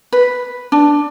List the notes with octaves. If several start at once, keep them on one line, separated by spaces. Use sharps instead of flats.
B4
D4